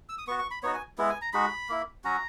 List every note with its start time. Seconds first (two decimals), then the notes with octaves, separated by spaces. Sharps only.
0.09 E6
0.18 D#6
0.27 B3 C#6
0.31 F#4
0.39 C#6
0.51 B5
0.63 B3 D#4 F#4 C#5
0.74 G#5
0.98 G#3 B3 E4
1.10 G#5
1.22 A#5
1.33 G#3 D#4 F#4 B5
1.69 A#3 E4
2.04 F#3 C#4 F#4 A#5